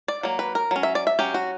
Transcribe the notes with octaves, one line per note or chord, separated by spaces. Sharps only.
D5
F#3 A#3
B4
A#4
F#3 C#4
E5
D5
E5
F#3 C#4 G4
F#4